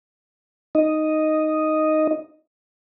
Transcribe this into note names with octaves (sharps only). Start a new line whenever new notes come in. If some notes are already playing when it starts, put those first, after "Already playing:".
D#4 D#5